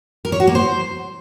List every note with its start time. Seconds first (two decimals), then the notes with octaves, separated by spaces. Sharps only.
0.25 A#4
0.32 C#5
0.40 F#4
0.47 A#3
0.55 C5